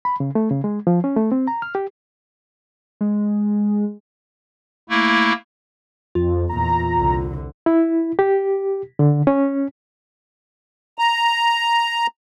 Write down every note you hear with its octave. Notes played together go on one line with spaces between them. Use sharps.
B5
C#3
A3
C#3
G#3
F3
C#4
A3
C4
A#5
F6
G4
G#3
A3 A#3 E4
F2 F4
E2 A#2 A#5
C2 D3
E4
G4
D3
C#4
A#5